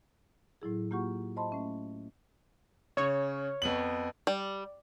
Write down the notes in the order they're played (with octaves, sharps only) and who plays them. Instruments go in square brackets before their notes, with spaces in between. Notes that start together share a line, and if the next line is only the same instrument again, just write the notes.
[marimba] A2 F#3 E4 G#4
A#3 F4 G4 F#5 C#6
C5 D#5 A5 B5 C6
A3 C#4 E5
[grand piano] C#3 [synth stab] C#5
[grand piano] F2 B3 F#7
[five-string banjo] G3